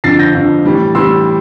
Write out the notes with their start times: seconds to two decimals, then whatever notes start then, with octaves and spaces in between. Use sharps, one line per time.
0.04 F2 D3 F3 A6 C7
0.19 G6 A#6
0.34 F2 D3 F3
0.65 A2 E3 G3
0.95 A2 E3 G3 C6 E6